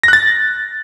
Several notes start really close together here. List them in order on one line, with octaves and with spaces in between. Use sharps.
A#6 F#6 A6